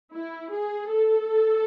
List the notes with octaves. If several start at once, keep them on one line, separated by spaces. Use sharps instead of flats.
E4
G#4
A4